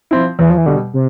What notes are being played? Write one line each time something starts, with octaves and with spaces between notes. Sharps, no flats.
F3 C4 E4
E2 E3
F3
E3
B2 D3 G3
C3